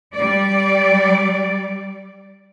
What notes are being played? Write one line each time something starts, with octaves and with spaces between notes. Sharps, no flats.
G3 D5